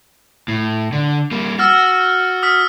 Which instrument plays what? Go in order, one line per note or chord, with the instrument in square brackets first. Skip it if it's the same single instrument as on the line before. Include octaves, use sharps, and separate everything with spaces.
[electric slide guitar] A2
D3
G3 A#3
[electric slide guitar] F#4 [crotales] E6 F6 A6
[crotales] D#6 F6 B6